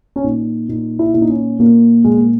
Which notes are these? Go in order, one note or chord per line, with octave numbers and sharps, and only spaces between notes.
C#4
A#2 D#4
A#2 D#4
E4
A#2 E4
D#4
C#4
A#2 A#3
A#2 G#3
A#3